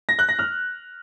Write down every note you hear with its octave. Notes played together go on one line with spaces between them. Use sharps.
A#6
F#6
A#6
F6